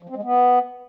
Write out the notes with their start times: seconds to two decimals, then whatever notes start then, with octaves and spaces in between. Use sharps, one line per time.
0.03 F3
0.09 C4
0.16 G#3
0.23 B3